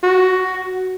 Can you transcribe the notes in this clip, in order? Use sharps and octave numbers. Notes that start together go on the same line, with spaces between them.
F#4